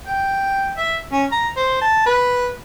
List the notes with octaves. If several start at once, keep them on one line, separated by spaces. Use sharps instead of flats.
G5
E5
C#4
A#5
C5
A5
B4